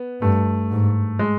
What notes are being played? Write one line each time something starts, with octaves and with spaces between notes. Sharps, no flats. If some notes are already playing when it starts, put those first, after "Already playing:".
Already playing: B3
G2 A3
G#2
G#3